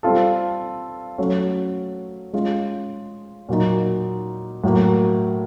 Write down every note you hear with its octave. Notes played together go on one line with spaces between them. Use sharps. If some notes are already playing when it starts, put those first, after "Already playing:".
G3 C4 F4 A4
F#3 A3 C#4
G#3 C#4 F4
A#2 F#3 A#3 D#4
A2 F#3 A#3